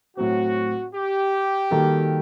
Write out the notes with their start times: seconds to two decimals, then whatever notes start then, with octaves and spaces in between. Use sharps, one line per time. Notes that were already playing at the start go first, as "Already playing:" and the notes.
0.17 A2 F#3 C4 F#4
0.94 G4
1.71 D#3 G3 A#3 F#4 A4